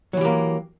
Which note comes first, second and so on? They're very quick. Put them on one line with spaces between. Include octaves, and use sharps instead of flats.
F#3 E3 G4 A#3